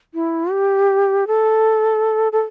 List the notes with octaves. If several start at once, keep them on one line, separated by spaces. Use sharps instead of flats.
E4
G4
A4
A4